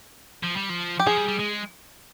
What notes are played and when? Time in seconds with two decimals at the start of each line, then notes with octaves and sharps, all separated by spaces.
0.43 F3
0.56 G3
0.69 F3
0.99 G4
1.07 F3 G#4
1.17 G3
1.28 G3
1.39 G#3